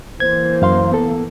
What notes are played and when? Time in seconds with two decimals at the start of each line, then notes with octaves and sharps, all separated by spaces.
0.20 E3 A#3 C5 G#6
0.62 F#2 F5 C6
0.92 B3 A4